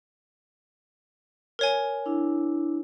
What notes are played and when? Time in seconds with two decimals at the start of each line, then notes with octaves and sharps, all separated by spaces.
1.59 A#4 C#5 G#5
2.06 D4 E4